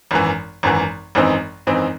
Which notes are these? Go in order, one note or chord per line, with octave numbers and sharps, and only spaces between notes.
G#1 F#2 E3
G#1 F#2 E3
G#1 F#2 E3 C4 D#4
G#1 F#2 E3 C4 D#4